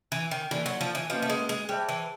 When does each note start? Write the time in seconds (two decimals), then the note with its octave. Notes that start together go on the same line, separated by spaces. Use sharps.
0.12 E3
0.31 D#3
0.51 E3 A#3 D#4 F#4 A4 D5
0.66 F#3
0.81 F3
0.95 E3
1.10 F3 A#3 C#4 F#4 B4 D#5
1.22 A3
1.30 G#3
1.49 G#3
1.69 G3 G#4 C5 E5 A5
1.89 E3